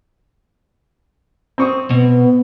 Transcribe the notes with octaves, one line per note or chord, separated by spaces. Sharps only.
C4 C#6 D#6
B2 B3